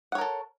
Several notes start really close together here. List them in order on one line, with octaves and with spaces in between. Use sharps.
F#5 C#5 A#4 A4